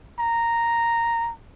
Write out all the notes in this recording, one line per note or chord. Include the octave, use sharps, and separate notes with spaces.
A#5